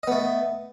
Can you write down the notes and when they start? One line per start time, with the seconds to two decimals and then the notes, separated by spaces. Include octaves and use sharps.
0.03 D#5
0.07 B3
0.12 A3